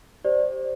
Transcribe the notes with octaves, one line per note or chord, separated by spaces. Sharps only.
G4 C5 D5